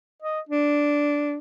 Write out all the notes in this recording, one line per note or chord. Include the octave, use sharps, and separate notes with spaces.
D#5
D4